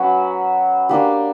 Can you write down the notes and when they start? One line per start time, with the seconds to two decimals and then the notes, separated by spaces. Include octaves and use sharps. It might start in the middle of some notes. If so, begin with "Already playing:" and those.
Already playing: F#3 C#4 F#4 B4
0.89 A#3 D4 G4